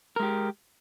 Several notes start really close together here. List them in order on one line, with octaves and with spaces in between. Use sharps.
A#4 G#3 G4